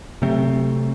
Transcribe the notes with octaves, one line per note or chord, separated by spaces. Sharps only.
C3 F#3 A3 C4